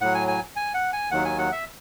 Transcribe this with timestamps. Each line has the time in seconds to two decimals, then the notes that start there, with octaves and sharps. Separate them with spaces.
0.01 A2 F#3 F#5
0.15 G#5
0.28 G#5
0.56 G#5
0.74 F#5
0.93 G#5
1.11 D#2 D#3 F#3 F#5
1.25 G#5
1.38 F#5
1.52 E5